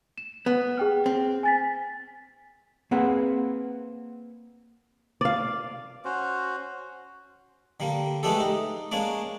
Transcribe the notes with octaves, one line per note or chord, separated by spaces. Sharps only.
E7
B3 F#5
G#4 G5 F6
C4
G#5 A6 B6
A#3 C4 G#4 B4 F#5
D5 F5
C#4 F#4 C5
D3 G3 A#3
G#3 A3 B3 D4 G4 A4
D#4
G#3 A#3 C#4 D4 D5